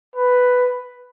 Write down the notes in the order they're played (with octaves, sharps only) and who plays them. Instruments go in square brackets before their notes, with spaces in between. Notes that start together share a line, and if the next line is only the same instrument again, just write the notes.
[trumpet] B4